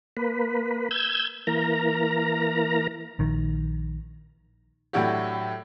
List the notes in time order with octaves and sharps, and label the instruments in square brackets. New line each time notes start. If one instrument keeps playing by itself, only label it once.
[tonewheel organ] A#3 B4
E6 G6 G#6
E3 A#3 A#4 A#5
[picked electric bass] A#1 D#3
[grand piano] A2 F#3 D4 E4 F#4 G4